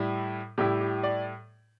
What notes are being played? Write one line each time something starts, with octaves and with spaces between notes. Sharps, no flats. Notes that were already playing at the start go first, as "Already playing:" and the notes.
Already playing: A2 G3 E4
A2 G3 E4 G4
G4
D5